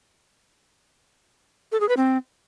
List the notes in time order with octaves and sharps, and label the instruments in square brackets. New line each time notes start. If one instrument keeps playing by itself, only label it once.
[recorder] A4
G#4
B4
C4